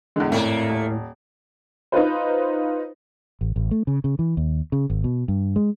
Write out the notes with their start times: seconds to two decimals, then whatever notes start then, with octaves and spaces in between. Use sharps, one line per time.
0.16 E2 A2 D3 G#3
0.32 G#1 F2 A2 A3 A#3
0.70 D#1
1.92 D#4 F4 B4 C5
3.41 A1
3.56 A1
3.71 A3
3.87 C#3
4.04 C#3
4.19 E3
4.37 D#2
4.72 C#3
4.90 G#1
5.04 B2
5.28 G2
5.56 G#3